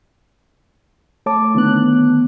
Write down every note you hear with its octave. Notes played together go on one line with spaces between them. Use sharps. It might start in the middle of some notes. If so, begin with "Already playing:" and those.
A3 C#5 A5 D6
D3 D#3 B3 F#6